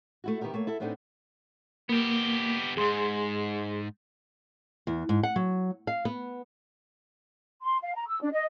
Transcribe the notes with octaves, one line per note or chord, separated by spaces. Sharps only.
A3 E4 F#4
D#3 B3 E4 G4 A#4
A3 A#3 C#5
E4 A4 E5
A2 B3 C4 D4 D#4 A4
A#3 B3 G4
E2 G#2 G#4 C6
E2
G#2
F#5
F#3
F5
B3
C6
F5
A#5
E6
D4
D#5